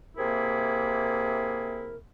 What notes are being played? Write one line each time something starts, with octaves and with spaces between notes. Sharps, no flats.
C3 A#3 E4 G#4 A#4